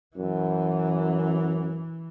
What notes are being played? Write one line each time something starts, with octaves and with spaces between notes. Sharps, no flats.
F#2 E3